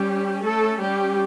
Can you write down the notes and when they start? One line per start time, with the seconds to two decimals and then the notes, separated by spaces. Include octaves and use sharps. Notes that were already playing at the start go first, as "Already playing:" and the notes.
Already playing: G3 C#4 G4
0.43 A3 A4
0.81 G3 G4